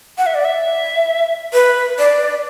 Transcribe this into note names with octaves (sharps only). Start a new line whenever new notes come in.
F#5
E5
D5
E5
B4
D5